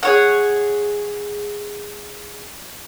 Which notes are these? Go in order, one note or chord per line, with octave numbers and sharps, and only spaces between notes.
G#4 C#5 F#5